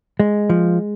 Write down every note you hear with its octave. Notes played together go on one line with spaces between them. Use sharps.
G#3
F3